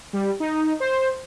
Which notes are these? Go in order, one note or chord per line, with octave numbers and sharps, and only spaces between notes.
G3
D#4
C5